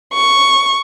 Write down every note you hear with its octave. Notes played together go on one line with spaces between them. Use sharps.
C#6